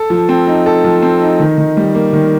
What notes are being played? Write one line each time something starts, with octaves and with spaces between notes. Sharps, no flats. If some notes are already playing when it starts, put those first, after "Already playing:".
Already playing: A4
F3
C4
D#4
A4
F3
C4
D#4
D#3
D#3
G3
A#3
D#3